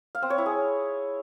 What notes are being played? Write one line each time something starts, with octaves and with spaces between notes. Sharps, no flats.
F5
C4
C#5
E4
G#4